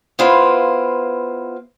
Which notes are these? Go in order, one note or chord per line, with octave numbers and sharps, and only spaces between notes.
B3 E4 F4 B4 C5 F5